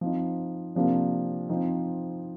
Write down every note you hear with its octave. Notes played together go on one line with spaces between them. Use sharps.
F3 C4 D#4
C3 F3 A#3 D4
F3 C4 D#4